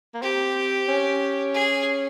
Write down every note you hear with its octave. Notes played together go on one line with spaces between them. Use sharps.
A#3
C4 G4
C#4
G#4